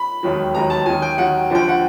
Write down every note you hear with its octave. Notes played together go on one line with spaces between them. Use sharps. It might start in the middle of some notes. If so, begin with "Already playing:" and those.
Already playing: B5
E1 D#2 D#3 F#3
E1 D#2 D#3 F#3 A#5
A5
D#2 D#3 F#3 G#5
G5
D#2 D#3 F#3 F#5
D#2 D3 F3 G5
F#5